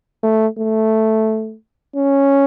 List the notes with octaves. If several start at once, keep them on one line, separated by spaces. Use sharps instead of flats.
A3
A3
C#4